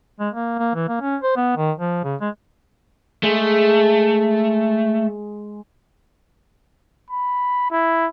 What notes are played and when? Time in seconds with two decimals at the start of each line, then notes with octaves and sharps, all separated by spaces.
0.20 G#3
0.34 A#3
0.59 A#3
0.75 E3
0.89 A#3
1.01 C#4
1.22 C5
1.36 B3
1.57 D#3
1.78 F3
2.04 C#3
2.21 G#3
3.23 G#3 A3
7.11 B5
7.71 E4